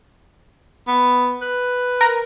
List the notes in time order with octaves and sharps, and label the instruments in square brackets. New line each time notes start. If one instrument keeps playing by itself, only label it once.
[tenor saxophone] B3
B4
[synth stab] A#4